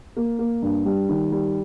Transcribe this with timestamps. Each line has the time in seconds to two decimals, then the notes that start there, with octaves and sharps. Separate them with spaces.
0.17 A#3
0.39 A#3
0.62 G2
0.86 G3
1.09 D#3
1.32 G3